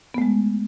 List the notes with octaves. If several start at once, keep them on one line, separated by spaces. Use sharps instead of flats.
G#3 A3 B3